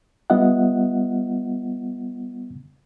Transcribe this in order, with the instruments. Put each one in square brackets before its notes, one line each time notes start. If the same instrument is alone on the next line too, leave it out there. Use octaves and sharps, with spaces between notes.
[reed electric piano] G3 B3 F4 D#5 E5 F#5